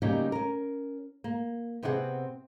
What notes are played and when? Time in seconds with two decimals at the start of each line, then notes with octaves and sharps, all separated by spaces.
0.02 C#3 F#3 G3 A#3 C#4 D#4
0.32 C#4 A#4
1.24 A#3
1.83 C3 B3 C4 G#4 D5 F#5